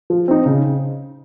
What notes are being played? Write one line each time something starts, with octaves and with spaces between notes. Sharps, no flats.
F3
C4 D#4
C#3